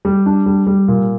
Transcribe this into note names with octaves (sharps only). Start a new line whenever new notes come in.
G3
D4
G3
G3
A#2